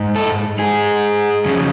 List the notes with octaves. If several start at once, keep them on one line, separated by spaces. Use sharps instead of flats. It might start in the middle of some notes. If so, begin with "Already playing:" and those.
Already playing: G#2
A4
G#2 G#4
F2 C#3